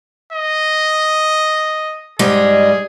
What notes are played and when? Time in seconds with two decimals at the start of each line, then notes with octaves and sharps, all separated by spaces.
0.33 D#5
2.19 G#2 G3 G#4 D#5